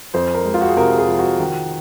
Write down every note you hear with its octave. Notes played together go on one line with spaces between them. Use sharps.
F2 C5
A#4
G#3
F4
F#4
G#4
C3 A#4
G#4
F3
F#4
D#3